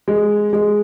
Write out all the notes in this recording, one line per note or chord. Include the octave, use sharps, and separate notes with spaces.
G#3
G#3